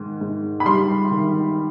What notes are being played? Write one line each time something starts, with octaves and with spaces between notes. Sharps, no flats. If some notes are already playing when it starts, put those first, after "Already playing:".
Already playing: G#2 D#3
G#2
B5
G3 C6
D#3